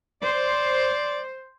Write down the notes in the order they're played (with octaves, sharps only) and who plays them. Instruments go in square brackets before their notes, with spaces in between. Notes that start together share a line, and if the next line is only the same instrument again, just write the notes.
[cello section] C5 [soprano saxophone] D5